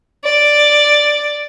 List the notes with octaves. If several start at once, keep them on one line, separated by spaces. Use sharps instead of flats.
D5